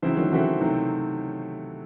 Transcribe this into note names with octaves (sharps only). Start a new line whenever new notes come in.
C#3 E3 F#3 C4 E4 C5
D#3 F#3
C#3 E3 C4 F#4 A4 C5 E5
C3 D#3 F#3 A3 C4